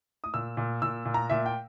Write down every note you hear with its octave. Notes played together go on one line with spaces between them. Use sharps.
D#6
A#2 E6
A#2
A#2 E6
A#2
A#5
A#2 E5
G5